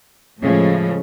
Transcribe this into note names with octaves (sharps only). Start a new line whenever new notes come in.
A2 C#3 F3 G#3 A3